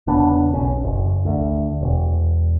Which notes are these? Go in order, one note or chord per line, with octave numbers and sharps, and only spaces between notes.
E1 C#3 B3 D4
B1 C#4
F#1
D2
E1